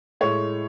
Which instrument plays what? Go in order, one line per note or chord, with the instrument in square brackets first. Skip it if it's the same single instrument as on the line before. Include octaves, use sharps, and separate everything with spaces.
[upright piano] A2 G#3 C#5